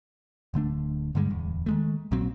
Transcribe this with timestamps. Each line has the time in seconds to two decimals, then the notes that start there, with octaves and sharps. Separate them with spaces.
0.54 D1 D3 A3 D4
1.15 G2 D3 G3 G#3
1.29 D1 E2
1.66 D#3 G#3 A3
2.11 A#1 A#2 F#3 C4